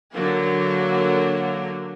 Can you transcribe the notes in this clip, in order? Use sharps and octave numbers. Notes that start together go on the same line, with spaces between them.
D3 F#3 A#3 A#4